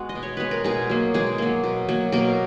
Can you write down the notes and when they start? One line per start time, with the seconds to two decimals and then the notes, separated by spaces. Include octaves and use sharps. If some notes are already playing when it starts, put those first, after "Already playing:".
Already playing: G#3 B3 F#4
0.09 D#5
0.15 B2
0.23 C#5
0.37 G#3 B3 B4
0.51 A#4
0.64 B2 G#3 G#4
0.89 F#3 A#3
1.14 B2 G#3 G#4
1.38 F#3 A#3
1.64 B2
1.88 F#3 A#3
2.12 B2 A#3 A#4